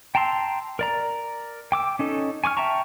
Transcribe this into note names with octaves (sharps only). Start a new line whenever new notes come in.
G5 A5 A#5 C6 E6
A#4 D5 A#5
G5 D6 E6
C#4 D#4 A4
G#5 C#6 D6 F6
E5 G5 A5 A#5 C#6